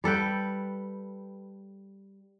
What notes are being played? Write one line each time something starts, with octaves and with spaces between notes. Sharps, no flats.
G3 A4 B4 G5